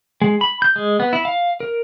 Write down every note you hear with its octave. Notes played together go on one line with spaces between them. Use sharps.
G#3
B5
G6
G#3
B3
E4
F5
A#4